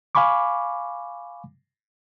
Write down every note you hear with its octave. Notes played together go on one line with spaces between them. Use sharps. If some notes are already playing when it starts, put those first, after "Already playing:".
F5 G#5 B5 C#6 D6